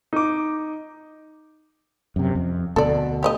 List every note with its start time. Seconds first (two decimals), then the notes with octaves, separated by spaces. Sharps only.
0.13 D#4 D6
2.16 F#2 C3
2.35 F2
2.76 D2 B2 A4 D5
3.23 G4 D5 D#5